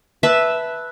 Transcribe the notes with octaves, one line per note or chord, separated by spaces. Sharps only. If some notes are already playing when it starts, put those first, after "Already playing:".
B4 E5 A5